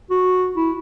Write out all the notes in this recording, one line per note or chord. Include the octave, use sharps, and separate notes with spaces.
F#4
E4